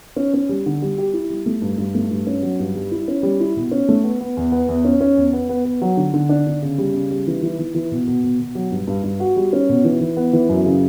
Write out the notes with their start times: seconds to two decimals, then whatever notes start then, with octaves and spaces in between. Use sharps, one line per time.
0.16 C#4
0.34 C#4
0.49 G3
0.66 D3
0.82 G3
0.98 G4
1.14 E4
1.30 G3
1.46 A3
1.62 G2
1.78 G2
1.95 A3
2.11 G2
2.27 C#4
2.43 F#3
2.59 G2
2.75 G3
2.91 E4
3.08 C#4
3.23 G3
3.40 E4
3.56 B2
3.71 C#4
3.89 A3
4.04 B3
4.20 B3
4.37 E2
4.52 B3
4.68 E2
4.85 C#4
5.01 C#4
5.17 E2
5.33 B3
5.49 B3
5.65 B3
5.82 F#3
5.97 D3
6.14 D3
6.29 D4
6.47 D3
6.62 C#3
6.78 G3
6.94 C#3
7.11 G3
7.27 E3
7.42 E3
7.59 E3
7.75 E3
7.91 B2
8.08 B2
8.24 B2
8.40 B2
8.55 F#3
8.72 G2
8.87 G2
9.04 G2
9.20 F#4
9.36 G3
9.53 C#4
9.69 B2
9.84 E3
10.01 E3
10.17 B3
10.33 E3
10.49 F#2
10.66 C#3